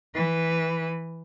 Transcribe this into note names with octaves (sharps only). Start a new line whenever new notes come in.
E3 B4